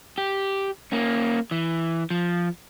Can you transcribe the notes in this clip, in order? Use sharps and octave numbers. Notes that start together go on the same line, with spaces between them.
G4
A#3 C#4
E3
F3